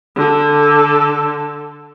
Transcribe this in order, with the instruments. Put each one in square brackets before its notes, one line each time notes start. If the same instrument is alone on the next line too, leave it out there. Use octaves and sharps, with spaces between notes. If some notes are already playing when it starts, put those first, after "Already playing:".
[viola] D3 A4